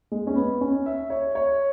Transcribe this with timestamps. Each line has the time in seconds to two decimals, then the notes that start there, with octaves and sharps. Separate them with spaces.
0.12 G#3
0.27 C#4
0.35 B3
0.61 C#4
0.86 E5
1.10 C#5
1.35 C#5